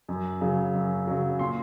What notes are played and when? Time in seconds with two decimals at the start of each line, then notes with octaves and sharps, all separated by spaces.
0.09 F#2
0.41 C#3 F#3
0.74 F#2
1.07 C#3 F#3
1.39 A#2 C6